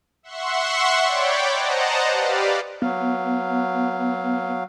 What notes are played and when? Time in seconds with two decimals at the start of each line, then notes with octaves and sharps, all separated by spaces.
0.23 E5 F#5 C6 C#6
1.03 C#5 D5 G5 B5 D6
1.52 C5 D#5 F#5 A5 A#5
2.12 G4 B4 D5 F5
2.82 F#3 B3 F5